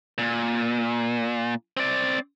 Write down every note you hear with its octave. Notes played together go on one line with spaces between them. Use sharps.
A#2
C4 D5